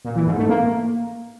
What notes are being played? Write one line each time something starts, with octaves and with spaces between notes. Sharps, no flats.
A#2
E3
G#2
A3
A#3